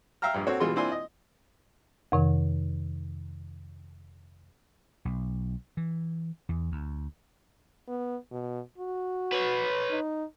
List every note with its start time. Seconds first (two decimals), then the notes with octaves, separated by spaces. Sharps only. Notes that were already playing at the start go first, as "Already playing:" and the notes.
0.22 E5 F5 G5 A#5 F6
0.34 A#1 G2
0.47 C4 F#4 A4 C#5
0.60 B2 E3 G3 G#3 F4 C6
0.76 C4 D4 E4 F4 G#5 C6
0.92 D#5
2.12 F2 C3 D#3
5.05 B1
5.77 E3
6.49 E2
6.72 D2
7.88 B3
8.31 B2
8.78 F#4
9.32 B4 C#5
9.91 D#4